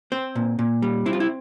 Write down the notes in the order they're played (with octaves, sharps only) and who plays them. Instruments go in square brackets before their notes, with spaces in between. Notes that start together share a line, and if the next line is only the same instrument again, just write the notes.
[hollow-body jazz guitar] C4 C5
A#2
A#2
G3
C4 E4
F4
E4